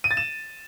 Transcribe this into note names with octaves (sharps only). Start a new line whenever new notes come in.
D#7
A6
E7